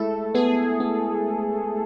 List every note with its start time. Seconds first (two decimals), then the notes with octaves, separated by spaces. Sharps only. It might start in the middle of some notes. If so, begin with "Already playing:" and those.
Already playing: G#3 A3 E4 A4
0.35 B3 G#4
0.80 B3